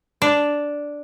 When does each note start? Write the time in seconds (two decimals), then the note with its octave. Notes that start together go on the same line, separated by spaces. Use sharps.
0.22 D4